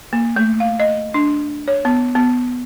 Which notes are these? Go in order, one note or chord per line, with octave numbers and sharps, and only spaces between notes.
A#3
A3
F5
D#5
D4
C#5
B3
B3